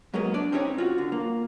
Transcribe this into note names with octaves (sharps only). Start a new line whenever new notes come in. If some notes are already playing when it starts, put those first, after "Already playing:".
G#2 F#3 G#3 A#3 B3
D4 D5
C4 C#4 D#4 G4 C#5
F4 F#4
D3
A#3